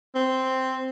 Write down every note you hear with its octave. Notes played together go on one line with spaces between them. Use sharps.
C4